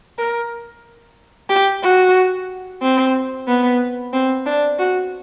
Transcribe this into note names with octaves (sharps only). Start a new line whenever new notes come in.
A#4
G4
F#4
C4
B3
C4
D4
F#4